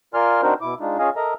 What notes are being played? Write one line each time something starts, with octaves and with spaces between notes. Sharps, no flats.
F4 A#4 D5 G#5 C6 F6
C4 D4 D#4 F#4 A#4 C5
B2 E4 D6
G#3 D4 D#4 F4
C#4 F4 G#4 D#5 F5 G#5
A4 A#4 D#5 E5 A#5